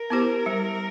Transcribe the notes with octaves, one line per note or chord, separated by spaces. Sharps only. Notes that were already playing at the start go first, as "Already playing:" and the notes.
Already playing: A#4
B3 E4 G4 C5
G3